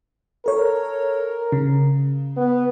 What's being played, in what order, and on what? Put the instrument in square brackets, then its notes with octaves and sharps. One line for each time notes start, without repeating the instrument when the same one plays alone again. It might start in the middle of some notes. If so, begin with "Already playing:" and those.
[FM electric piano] A4 C#5 [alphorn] A#4
[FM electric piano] C#3
[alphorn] B3